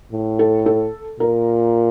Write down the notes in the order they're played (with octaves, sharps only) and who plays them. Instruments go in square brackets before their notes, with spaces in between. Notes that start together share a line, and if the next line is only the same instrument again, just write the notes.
[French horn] A2
[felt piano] A4
A4
[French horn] A#2 [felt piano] A#4